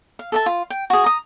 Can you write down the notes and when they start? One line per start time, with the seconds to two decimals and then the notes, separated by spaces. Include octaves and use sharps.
0.19 F5
0.32 A4 E5 A5
0.46 F4
0.70 G5
0.90 F#4 G#4
1.04 A#5 D#6